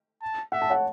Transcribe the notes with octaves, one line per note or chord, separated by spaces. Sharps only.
A5
E5 F#5
A5
C#5 F#5